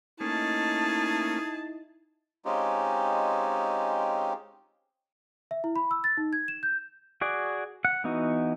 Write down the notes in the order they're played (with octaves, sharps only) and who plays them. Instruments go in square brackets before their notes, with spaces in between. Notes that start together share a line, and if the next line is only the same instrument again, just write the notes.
[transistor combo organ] A3 A#3 C#4 [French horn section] D#4 E4 [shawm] G#4 [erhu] A5
[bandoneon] G#3 C4 C#4 D#4 F4 G4
[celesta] E5
E4
B5
E6
A6
D#4
G#6
E7
G6
[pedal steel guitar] F#4 G#4 D5
F#5
E3 B3 D#4 F#4